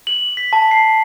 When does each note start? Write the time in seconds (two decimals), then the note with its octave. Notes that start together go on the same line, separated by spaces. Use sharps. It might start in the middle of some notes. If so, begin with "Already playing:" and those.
0.07 F#7
0.37 B6
0.53 A5
0.71 C7